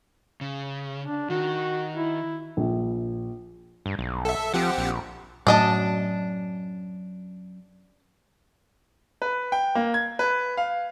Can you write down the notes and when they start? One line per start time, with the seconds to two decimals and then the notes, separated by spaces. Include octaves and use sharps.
0.41 C#3
1.05 D4
1.30 D#3 F#4
1.96 E4
2.57 A#1
3.86 G2
3.99 B1
4.25 A4 E5
4.54 F3 C4 G4 F#5
4.78 A#1
5.47 F#2 A2 A3 D4 D#5 A5
9.22 B4
9.52 G5
9.75 A#3
9.94 G#6
10.19 B4
10.57 F5